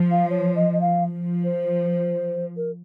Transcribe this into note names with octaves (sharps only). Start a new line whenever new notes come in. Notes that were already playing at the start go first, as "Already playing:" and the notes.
Already playing: F3
F5
C#5
D#5
D#5
F5
F3
C5
A#4